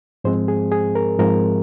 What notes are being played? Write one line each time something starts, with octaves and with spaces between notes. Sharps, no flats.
G#2 F3 G#3 C4 C5
G#4
G#4
A#4
G#2 F3 G#3 C4 A#4